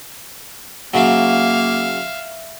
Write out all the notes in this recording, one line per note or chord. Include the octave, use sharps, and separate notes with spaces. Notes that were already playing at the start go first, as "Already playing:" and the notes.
C#3 F#3 A#3 E5 F5